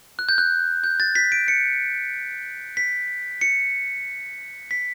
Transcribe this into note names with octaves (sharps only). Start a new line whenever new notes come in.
F#6
G6
F#6
G6
A6
B6
D7
C#7
B6
C#7
B6